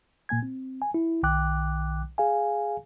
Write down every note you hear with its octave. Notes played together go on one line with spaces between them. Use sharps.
A#2 A#3 G#5 G#6
C4
G#5
E4
B1 D#3 G5 D6 F#6
G#4 F5 G#5